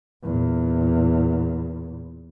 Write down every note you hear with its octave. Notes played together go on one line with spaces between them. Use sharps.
E2 A#2